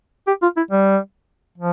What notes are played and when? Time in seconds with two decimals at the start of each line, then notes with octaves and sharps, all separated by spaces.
0.27 G4
0.42 F4
0.57 E4
0.71 G3
1.58 F3